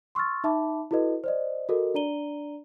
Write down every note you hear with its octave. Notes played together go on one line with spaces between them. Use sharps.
C6 C#6 E6 F6 A6
D#4 E5 A5 B5 D6
E4 F#4 A4 B4 D#5
C5 D5 D#5
F#4 A4 A#4 D#5
D4 D5 A#5 D#7 G7